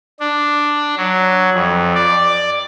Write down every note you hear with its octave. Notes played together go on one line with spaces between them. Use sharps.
D4
F#3
F2
D5